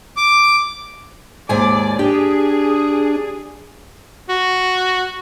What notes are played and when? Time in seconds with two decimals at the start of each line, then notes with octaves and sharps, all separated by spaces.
0.17 D6
1.49 D#2 G#2 D5 G#5
1.99 D4 G4 G#4
4.29 F#4